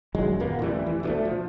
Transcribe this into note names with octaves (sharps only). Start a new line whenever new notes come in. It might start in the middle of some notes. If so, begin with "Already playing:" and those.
F#2 D#3 F#3 G#3
D#2 A#2 A#3 B3
A1 F2 E3 G3
E3
D2 B2 A3
F3